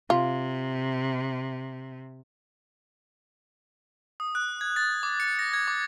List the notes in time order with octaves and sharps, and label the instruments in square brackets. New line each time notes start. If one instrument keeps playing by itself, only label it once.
[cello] C3 [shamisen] F4
[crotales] D#6
F#6
G#6
A6
D6
C#7
A#6
G#6
D6